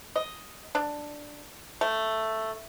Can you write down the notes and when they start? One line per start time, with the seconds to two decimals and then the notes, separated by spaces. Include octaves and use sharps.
0.16 D#5
0.75 D4
1.81 A3